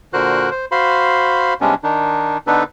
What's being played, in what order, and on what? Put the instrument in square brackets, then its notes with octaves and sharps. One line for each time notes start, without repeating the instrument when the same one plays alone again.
[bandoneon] A#2 D3 F#4 A#4 C5 F#6
C5
F#4 C5 F5 B5 C6
C3 G3 G#3 B3 C#4 D4
D#3 D4 D#4
D3 B3 D4 D#4 A4 B4